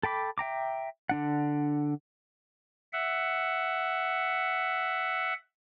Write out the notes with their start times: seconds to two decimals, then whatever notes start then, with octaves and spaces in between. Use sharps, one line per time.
0.03 A4 G5 B5 D6
0.38 E5 G5 A#5 D6
1.09 D3 D4 F#5
2.93 E5 F#5